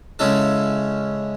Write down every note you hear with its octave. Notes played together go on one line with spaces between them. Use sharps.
C#3 G#3 C#4 E4 A4